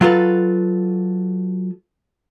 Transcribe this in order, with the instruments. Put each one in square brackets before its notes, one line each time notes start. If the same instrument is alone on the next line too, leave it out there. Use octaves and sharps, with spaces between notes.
[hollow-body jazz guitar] F#3 F4 A4 B4